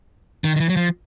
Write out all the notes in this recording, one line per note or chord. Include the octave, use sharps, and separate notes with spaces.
D#3
D#3
E3
F#3
F3